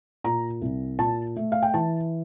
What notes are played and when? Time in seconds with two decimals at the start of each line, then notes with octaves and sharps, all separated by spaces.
0.24 A#2 A#5
0.61 C2
0.99 A#2 A5
1.36 A3
1.52 F5
1.63 G5
1.74 E3 A5